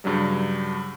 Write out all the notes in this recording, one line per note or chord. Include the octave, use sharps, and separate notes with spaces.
G2 C#3 F#3 G3